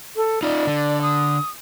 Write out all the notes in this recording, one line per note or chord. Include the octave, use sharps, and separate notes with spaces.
A4
D#4 F4 D5
D3
D#6